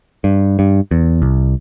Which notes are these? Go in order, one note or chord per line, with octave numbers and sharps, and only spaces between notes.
G2
G2
E2
C2